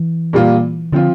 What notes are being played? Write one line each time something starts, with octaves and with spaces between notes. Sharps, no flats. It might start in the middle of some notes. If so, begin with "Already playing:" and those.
Already playing: E3
A#2 G3 A#3 F4
D3 F3 C4 F4